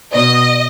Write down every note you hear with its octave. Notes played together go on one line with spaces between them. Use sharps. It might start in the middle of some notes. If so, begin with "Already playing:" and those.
B2 D#5